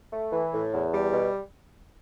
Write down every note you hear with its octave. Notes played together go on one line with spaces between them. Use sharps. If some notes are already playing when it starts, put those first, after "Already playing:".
A3
E3
A2
E2
G3
B2